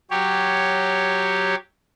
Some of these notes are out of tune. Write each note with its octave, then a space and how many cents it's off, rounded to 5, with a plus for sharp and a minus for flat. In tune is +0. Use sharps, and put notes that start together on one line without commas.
F#3 +0 G4 +0 C#5 +0